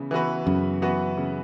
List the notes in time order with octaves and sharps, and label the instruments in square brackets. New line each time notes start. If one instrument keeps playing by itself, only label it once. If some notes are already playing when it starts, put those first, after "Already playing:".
Already playing: [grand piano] C#3 E3 B3
E3 B3 F#4 B4
[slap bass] F#2 [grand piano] C#3
[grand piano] E3 B3 F#4 B4
C#3